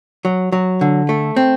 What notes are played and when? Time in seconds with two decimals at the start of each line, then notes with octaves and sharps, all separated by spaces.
0.25 F#3
0.52 F#3
0.81 D3
1.09 A3
1.36 C4